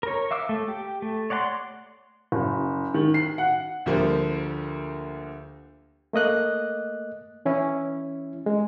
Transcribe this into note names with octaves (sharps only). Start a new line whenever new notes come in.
A#4 C#5
E5 F5 D6 E6
A3
G4
A3
C#5 D5 F#5 A5 C6
F#1
D#3
C7
F#5
D2 D3 F3 G3 A#3
A3 A#3 D#5 F#6
E3 C#4 E4
G#3